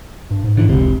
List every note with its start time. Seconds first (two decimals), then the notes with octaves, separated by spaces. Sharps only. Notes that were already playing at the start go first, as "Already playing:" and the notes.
0.31 G2
0.44 G#2
0.57 G#2 D3 E3
0.69 F1 C#2 C3